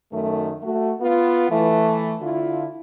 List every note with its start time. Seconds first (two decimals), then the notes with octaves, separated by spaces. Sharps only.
0.12 F#2 D#3 A3
0.63 A3 F#4
1.01 B3 F4
1.50 E3 A3
2.21 D3 E4 F4